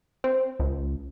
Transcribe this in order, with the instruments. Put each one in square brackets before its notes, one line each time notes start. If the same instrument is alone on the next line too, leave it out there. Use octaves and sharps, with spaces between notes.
[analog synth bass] C4
C#2